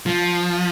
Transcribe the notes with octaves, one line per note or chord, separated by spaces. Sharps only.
F3